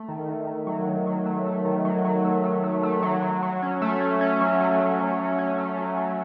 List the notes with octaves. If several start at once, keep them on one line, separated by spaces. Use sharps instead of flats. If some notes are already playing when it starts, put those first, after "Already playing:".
Already playing: A3
D#3
D#3
D#3
F#3
D#3
F#3
A3
A3
D#3
F#3
F#3
A3
A3
A3
A3
F#3
F#3
F#3
C#4
A3
C#4
C#4
F#3
F#3
A3
F#3
F#3
C#4
A3
F#3
F#3